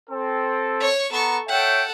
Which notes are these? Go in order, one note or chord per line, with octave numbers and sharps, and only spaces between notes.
C4 A4
C#5 C#6
B3 A4 A#5 C#6
A4 C#5 E5 F#5 G5